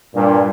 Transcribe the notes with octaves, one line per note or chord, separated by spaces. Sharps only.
G2 A#2